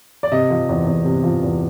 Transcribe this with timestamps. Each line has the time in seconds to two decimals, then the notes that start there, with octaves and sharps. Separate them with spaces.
0.23 D5
0.32 C3 D#5
0.50 F3
0.69 E2
0.87 E2
1.05 C3
1.24 F3
1.43 E2